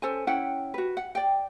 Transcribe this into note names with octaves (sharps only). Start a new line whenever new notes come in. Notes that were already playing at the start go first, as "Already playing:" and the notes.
C#4 A4 C5 G#5
C#4 E4 F#5 G5
F#4 B4
F#5
D5 G5